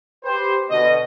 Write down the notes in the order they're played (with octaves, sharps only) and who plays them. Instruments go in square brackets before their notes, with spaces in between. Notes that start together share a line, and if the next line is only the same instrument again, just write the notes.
[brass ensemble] G4 B4 C5
B2 D3 B3 D#5